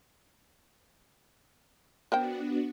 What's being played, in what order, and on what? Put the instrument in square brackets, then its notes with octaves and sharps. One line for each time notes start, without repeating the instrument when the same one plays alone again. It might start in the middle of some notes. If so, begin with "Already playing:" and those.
[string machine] B3 D4 F#4 [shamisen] A#4 C5 G5